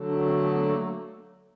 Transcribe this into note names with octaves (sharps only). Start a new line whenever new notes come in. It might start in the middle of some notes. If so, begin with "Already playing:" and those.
Already playing: D3 F#3 A3
D4
C4
B3
A#3